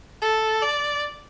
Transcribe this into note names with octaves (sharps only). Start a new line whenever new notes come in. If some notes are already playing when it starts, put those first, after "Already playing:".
A4
D5